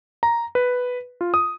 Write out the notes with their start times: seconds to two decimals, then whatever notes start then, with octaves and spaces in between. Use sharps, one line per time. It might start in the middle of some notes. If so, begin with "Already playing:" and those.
0.23 A#5
0.55 B4
1.21 F4
1.34 D#6